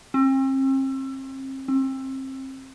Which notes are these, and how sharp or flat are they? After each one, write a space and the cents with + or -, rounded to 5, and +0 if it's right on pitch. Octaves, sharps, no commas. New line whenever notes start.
C4 +40
C4 +30